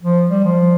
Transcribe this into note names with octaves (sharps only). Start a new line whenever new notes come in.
F3
G3
F3